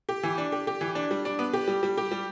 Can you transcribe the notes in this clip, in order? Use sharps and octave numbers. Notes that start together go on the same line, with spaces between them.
G4
E3
D4
G4
G4
E3
D4
G3
D4
B3
G4
G3
G3
G4
G3